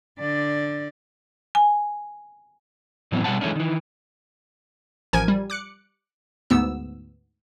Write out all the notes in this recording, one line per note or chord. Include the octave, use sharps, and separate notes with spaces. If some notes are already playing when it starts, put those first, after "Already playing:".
D3 D5
G#5
A2 E3 F#3 B3 C4
B2 G3 F#5 A5
E3 G#3 A3 C#4 D4
D#3 E3
A1 F3 A#4 G#5 G#6
G3
D6 F#6 C#7
D2 G#2 B3 E6